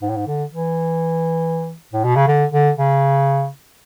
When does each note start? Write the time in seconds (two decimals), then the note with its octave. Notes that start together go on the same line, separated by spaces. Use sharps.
0.02 G#2
0.09 A2
0.17 G#2
0.27 D3
0.52 E3
1.93 A2
2.04 B2
2.16 C#3
2.27 D3
2.53 D3
2.78 C#3